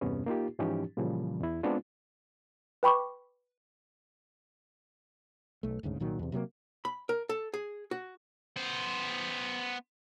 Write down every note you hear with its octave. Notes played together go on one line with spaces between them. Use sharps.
E2 G2 C3 B3 C#4
A#3 D#4 F4 G4
G#2 E3 F3 C#4 D#4 G4
A#2 C#3 E3 F3 G3
E2 E4
G#3 B3 C4 D4 F4
B4 G5 B5 C#6 D6
B1 A3
D#1 D2 G#2 C#3
C2 A#2 D#3 F#3
E2 C3
C3 F#3 G#3 A#3
B5
A#4
A4
G#4
F#4
B3 C5